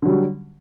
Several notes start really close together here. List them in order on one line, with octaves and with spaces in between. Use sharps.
D3 F#3 G3